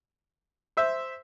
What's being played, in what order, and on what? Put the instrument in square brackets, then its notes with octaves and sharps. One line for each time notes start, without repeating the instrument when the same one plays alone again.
[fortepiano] C5 E5